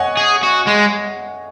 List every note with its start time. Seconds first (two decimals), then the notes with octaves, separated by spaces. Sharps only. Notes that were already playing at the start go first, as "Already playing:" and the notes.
Already playing: C#5 D#5 F#5 G#5
0.17 G#4
0.43 F#4
0.67 G#3